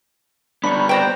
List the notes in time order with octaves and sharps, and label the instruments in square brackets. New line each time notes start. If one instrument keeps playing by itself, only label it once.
[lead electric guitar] G3 B3 [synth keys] D4 C#6 [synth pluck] B5
[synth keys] B4 D5 A#5 [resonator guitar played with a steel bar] C5 G5